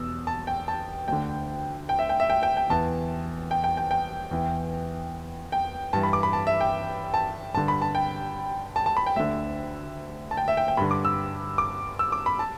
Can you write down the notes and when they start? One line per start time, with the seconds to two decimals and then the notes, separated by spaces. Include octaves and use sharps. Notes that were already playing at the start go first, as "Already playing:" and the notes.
Already playing: E2 B2 E6
0.27 A5
0.47 G5
0.68 A5
1.08 D2 D3 G5
1.89 G5
1.99 E5
2.09 G5
2.20 E5
2.30 G5
2.43 G5
2.57 G5
2.70 E2 E3 A5
3.51 G5
3.64 G5
3.77 G5
3.91 G5
4.31 E2 E3
5.52 G5
5.93 G2 E3 A5
6.03 B5
6.13 D6
6.23 B5
6.33 A5
6.47 E5
6.60 G5
7.14 A5
7.54 G2 D3 A5
7.68 B5
7.82 A5
7.95 G5
8.76 A5
8.86 A5
8.97 B5
9.06 G5
9.16 D2 D3 E5
10.31 A5
10.37 G5
10.48 E5
10.57 G5
10.68 G5
10.77 G2 D3 B5
10.91 D6
11.05 E6
11.58 D6
11.99 E6
12.12 D6
12.26 B5
12.39 A5